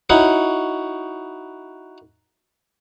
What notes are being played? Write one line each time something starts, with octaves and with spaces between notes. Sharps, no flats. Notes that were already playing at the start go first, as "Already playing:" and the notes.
D#4 E4 F#4 C#5